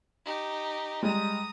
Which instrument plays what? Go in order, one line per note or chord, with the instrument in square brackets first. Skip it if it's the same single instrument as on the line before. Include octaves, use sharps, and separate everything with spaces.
[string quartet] D#4 G4
[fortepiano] G3 G#3 [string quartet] A#5 D#6